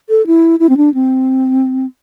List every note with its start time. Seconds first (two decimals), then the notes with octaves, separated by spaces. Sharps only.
0.09 A4
0.27 E4
0.60 E4
0.69 C4
0.77 D4
0.94 C4